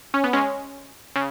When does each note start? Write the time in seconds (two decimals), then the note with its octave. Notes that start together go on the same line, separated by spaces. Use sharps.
0.14 C#4
0.24 B3
0.33 G#3 C#4
1.16 C#3